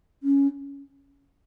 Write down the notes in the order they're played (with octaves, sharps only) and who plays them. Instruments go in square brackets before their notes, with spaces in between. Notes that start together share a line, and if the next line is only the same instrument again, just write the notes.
[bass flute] C#4